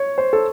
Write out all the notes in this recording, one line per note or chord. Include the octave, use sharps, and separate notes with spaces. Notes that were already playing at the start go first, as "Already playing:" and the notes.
Already playing: C#5
C5
A4